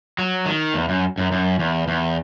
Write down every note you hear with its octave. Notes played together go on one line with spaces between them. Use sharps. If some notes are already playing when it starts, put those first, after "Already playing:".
F#3
D#3
E2
F#2
F#2
F#2
E2
E2